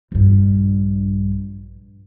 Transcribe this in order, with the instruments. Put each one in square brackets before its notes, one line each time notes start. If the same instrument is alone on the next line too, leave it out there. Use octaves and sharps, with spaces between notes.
[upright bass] A#1 G2